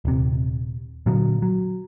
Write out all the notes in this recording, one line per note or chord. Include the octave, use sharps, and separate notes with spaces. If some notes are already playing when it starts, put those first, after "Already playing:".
D#1 C3
A#2 D3 F#3
F#3